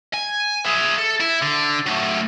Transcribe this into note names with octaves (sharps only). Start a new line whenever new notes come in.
G#5
G#4 E5
A4
E4
D3
F#3 A3